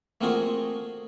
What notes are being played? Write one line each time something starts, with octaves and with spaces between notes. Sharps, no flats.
A3 A#3 C4 F4 F#4 G#4